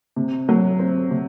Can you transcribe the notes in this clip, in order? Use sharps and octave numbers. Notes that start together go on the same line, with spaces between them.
C3
F#3
C4
C3